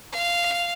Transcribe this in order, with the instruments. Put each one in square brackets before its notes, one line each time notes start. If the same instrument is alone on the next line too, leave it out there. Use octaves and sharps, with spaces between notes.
[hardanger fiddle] F5